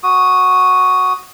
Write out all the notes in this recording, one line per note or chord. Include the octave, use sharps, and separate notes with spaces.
F#4 D#6